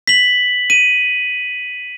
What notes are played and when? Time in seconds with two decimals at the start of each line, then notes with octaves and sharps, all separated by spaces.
0.07 B6 F#7
0.70 D#7